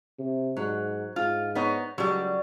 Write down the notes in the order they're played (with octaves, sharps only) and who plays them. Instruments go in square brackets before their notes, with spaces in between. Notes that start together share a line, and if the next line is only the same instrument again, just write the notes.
[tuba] C3
[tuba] G#2 [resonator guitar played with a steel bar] F#3
[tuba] G#2 [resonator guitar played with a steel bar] F4
[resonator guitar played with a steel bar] B3 D#4 C#5
[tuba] C#2 [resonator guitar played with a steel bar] F#3 G3